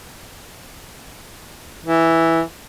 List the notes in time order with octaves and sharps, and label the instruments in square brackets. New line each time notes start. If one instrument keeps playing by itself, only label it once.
[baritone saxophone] E3